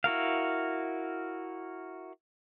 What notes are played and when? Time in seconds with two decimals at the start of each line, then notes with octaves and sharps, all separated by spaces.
0.04 E4 F#4 A#4 F5